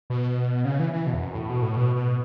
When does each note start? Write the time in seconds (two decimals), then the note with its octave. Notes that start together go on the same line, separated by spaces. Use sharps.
0.10 B2
0.65 C#3
0.80 E3
0.93 E3
1.07 B2
1.14 E2
1.22 F#2
1.35 A2
1.49 B2
1.62 A2
1.77 B2
1.96 B2